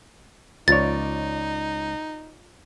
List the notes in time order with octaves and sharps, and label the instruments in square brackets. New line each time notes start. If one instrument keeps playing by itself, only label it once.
[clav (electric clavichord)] C#2 C#5 [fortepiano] F3 D5 [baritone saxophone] D#4 [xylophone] A6